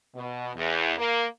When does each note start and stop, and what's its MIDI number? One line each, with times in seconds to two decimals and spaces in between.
0.15 0.51 47
0.55 0.93 40
0.98 1.25 58